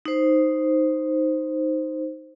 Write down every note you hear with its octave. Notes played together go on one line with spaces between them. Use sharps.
D#4 C5